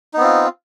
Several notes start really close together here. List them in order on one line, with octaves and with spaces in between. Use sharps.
D#4 B3 C4 F4